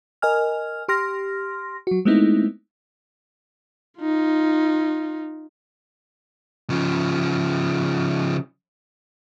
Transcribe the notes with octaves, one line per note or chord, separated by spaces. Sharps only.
A#4 D#5 G#5 F6
G4 C6 F6 A#6
F#3 F#4
G#3 A3 B3 C4 D#4 E4
D#4 F4
C#3 F3